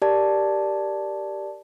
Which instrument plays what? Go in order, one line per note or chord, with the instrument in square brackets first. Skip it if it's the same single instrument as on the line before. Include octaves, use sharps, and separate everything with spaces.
[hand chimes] G4 A#4 D5 A5